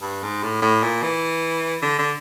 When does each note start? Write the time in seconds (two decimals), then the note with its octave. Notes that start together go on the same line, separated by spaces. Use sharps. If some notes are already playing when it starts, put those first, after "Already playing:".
0.02 G2
0.23 G#2
0.43 A2
0.62 A2
0.83 A#2
1.03 E3
1.82 D3
1.98 D3